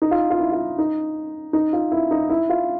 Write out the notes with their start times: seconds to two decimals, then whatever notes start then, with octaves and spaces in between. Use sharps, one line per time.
0.02 D#4
0.11 F4
0.30 F4
0.39 E4
0.52 F4
0.78 D#4
1.53 D#4
1.73 F4
1.92 E4
2.11 D#4
2.29 E4
2.49 F4